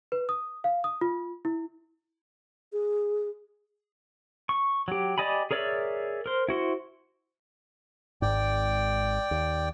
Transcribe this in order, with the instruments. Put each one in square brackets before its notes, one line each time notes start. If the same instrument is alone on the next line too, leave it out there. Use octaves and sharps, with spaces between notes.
[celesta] B4
D#6
F5
D#6
F4
E4
[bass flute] G#4
[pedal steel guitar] C#6
F#3 G4
G4 D5 D#5 G#5 B5
G#4 A#4 C#5 D5 E5
A#4 C5
E4 F#4 C5
[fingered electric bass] G#1 G#2 [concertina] D5 G5
[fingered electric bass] D#2